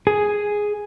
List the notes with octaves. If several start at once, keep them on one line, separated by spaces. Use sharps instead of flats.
G#4